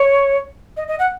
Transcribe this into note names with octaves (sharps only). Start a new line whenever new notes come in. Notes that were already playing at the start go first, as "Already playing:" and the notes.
Already playing: C#5
D#5
D#5
F#5